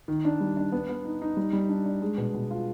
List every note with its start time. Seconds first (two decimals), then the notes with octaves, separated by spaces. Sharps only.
0.08 D#3
0.25 D4
0.40 G3
0.57 D4
0.72 B3
0.89 B3
1.05 D#4
1.22 D#4
1.37 G3
1.53 G3
1.69 D4
1.86 D4
2.02 G#3
2.18 B2
2.34 B2
2.51 F4